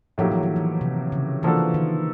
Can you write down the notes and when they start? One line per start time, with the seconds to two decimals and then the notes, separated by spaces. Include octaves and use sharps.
0.18 A2 F3 F#3 A#3 D#4 G4
0.32 E3
0.43 D#3
0.56 E3
0.81 C3
1.12 C#3
1.43 E3 F3 A#3 D4 F#4 A4
1.74 D#3